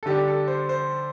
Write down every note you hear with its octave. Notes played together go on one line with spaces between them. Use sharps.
A4
D3 G3 D4 G4
A4
C5
C5